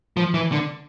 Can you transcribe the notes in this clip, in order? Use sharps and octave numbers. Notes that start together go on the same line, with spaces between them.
F3
E3
D3